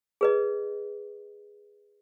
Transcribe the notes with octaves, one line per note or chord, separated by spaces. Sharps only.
G#4 B4 D#5